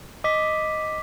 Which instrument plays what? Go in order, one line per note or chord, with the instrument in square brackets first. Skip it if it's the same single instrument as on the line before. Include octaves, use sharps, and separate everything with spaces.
[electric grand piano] D#5 [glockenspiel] D6 B6